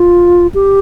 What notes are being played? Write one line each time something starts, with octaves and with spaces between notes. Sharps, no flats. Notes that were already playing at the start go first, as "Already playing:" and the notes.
Already playing: F4
G4